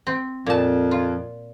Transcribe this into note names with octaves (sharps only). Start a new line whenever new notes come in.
C4
F2 A#2 A5
F4